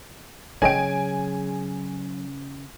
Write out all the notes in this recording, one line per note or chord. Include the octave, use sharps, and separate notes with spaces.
C#3 F#3 C#4 C#5 D#5 G5 G#5 D7